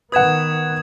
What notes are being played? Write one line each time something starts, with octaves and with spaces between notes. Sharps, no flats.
D#3 B3 B4 F#5 D#6 G#6 E7